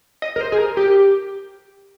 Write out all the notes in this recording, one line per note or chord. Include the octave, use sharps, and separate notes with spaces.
D#5
A#4
C5
G#4
A#4
G4